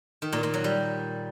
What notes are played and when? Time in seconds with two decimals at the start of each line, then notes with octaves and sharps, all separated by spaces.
0.22 D#3
0.33 A#2
0.43 A#2
0.54 F#3
0.64 G3